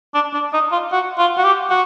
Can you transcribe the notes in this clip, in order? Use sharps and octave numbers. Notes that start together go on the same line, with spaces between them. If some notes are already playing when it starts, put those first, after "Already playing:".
D4
D4
D#4
F4
F#4
F4
F#4
G4
F#4